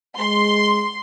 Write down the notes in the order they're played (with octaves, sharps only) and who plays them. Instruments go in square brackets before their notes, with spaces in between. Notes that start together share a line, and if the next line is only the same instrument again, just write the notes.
[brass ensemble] G#3 [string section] C6